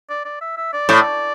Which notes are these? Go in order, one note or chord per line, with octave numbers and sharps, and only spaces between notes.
D5
D5
E5
E5
D5
A2